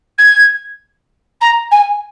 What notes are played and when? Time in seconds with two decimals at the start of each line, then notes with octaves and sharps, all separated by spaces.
0.18 G#6
1.41 A#5
1.71 G#5